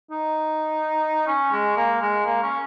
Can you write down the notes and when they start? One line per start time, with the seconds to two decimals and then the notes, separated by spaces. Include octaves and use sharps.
0.11 D#4
1.27 C#4
1.52 G#3
1.77 A#3
2.01 G#3
2.25 A#3
2.42 C#4